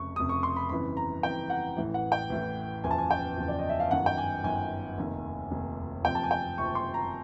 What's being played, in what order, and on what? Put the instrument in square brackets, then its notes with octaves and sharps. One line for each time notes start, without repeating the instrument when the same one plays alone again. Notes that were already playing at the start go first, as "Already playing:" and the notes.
Already playing: [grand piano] F1 F2 C#3 C#6
F1 F2 C#3 D#6
C#6
C6
B5
G1 F2 C#3 E3 B5
A#5
G1 F2 C#3 E3 G5
F#5
A1 A2 E3
F#5
G5
A1 A2 E3
F#1 E2 C#3 F3 G#5
A5
G#5
G5
F#1 E2 C#3 F3
D5
D#5
E5
F5
G1 F#2 D#3 F#5
G5
G#5
G1 F#2 D#3 G#5
F1 D#2 D#3
F1 D#2 D#3
F#1 F2 C3 F3 G5
A5
G#5
G5
F#1 F2 C3 F3 C#6
C6
A#5